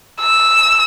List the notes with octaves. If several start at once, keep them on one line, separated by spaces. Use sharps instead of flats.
E6